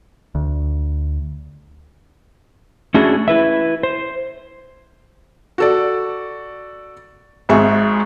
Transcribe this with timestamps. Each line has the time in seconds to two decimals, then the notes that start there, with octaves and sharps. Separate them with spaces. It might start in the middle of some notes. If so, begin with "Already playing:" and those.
0.35 D2
2.94 A3 C#4 D4 E4 F#4 G#4
3.28 E4 B4 E5
3.83 C5
5.58 F#4 A4 D5
7.49 G#1 G#2 G#4 E5 C#6